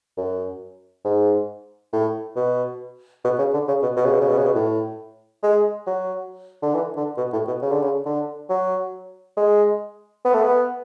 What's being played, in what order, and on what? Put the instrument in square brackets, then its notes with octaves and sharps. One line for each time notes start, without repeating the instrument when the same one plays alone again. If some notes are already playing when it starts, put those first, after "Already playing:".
[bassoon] F#2
G#2
A2
B2
B2
C#3
D3
C#3
B2
B2
C#3
B2
C#3
B2
C#3
B2
A2
G#3
F#3
D3
E3
D3
B2
A2
B2
C#3
D3
C#3
D3
F#3
G#3
B3
A3
B3